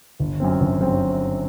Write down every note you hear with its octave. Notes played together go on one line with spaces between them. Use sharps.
G1
F#2 F#3 C4
G1
F#2 F#3 C4